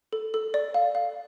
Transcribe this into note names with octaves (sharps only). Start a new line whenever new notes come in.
A4
A4
D5
F5
F5